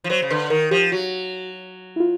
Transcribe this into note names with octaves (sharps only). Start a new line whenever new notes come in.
F3
F#3 C5
C#3
D3 B4
D#3 A#4
F3 G4
F#3 F#4
E4
F4